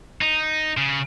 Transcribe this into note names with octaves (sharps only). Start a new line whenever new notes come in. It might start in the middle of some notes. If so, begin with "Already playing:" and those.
D#4
C#3